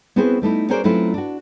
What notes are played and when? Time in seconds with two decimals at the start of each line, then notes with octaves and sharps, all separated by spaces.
0.16 B3 C4 E4 F#4 G#4 C5
0.42 G3 A3 D#4 E4
0.69 C#4 F#4 G#4 A#4 C5 D5
0.84 F#3 A3 C4 C#4 E4 F4
1.14 D4 F#4